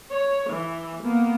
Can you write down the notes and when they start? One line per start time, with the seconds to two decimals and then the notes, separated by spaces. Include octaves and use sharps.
0.11 C#5
0.49 E3
1.03 A#3 B3